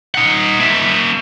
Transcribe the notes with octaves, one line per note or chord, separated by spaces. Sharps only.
D#4 F#5
A#3 E5